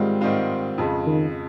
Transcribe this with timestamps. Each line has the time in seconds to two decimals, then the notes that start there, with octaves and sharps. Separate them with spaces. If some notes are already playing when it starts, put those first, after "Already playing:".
Already playing: G#2 D#3 G3 G#3 C4 F4
0.21 G#2 D#3 G3 C4 F4
0.78 F2 C#3 G#3
1.06 D#3